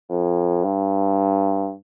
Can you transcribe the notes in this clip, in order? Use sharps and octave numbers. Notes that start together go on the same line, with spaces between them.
F2
G2